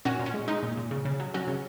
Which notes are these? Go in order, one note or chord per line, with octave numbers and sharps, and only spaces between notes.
A#2 C#4 F#4
A#2
C#4
G#3
G#3 D#4
A#2
A#2
C#3
C#3
F#3
F#3 C#4 F#4
C#3